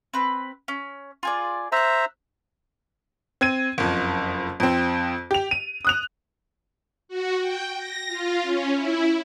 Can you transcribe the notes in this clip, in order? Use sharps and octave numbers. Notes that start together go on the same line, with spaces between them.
C4 B4
C#4
F4 G#4 D5
C5 E5 A#5 E6 F#6
C4 G#6 D#7
F#1 F2
F2 C4
G4 F7
D#7
D#6 F#6 F7
F#4
G5
A#6
F4
C#4
E4